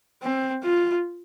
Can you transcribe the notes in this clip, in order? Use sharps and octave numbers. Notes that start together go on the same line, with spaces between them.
C4
F4